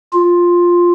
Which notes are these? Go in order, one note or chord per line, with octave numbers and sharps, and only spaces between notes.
F4